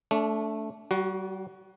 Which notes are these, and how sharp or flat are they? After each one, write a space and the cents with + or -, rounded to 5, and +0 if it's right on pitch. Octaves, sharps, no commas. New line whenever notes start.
A3 +0 D4 -35
G3 -40 F#4 +5